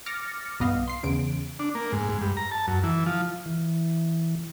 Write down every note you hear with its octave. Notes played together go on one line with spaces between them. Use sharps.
D6 F6 A6 A#6 C#7
B1 G2 B3 D#5 F5
C6 C7
E2 C#3 D7
D4
A#3
G#2
G#2
G2
A#5
A5
F#2
E3
F3
E3